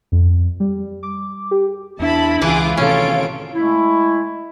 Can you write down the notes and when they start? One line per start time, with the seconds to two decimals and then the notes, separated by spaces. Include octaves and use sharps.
0.12 F2
0.60 G3
1.03 D6
1.51 G4
2.00 E2 D4 E4 A5 B5
2.41 C#2 E3 F4 G#4 F#5 D6
2.77 A2 C3 D#3 C#4 F4 A4 C#5 D7
3.54 G#3 A3 E4